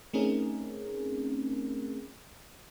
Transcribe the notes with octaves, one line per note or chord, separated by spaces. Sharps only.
A3 C4 C#4 D#4 G#4 A#4